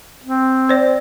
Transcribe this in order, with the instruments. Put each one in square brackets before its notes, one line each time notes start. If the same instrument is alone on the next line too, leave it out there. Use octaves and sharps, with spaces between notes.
[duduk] C4
[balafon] C5 D5